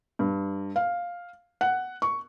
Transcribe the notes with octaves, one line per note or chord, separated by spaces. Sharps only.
G2
F5
F#5
C#6